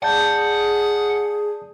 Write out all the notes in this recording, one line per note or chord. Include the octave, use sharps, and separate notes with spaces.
G#4 D5 F#5 A5 G6